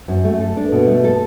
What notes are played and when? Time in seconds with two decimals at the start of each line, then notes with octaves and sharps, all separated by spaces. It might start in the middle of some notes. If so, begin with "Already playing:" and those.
0.08 F#2
0.24 A3
0.40 A4
0.57 D4
0.72 B2
0.87 A3
1.04 A4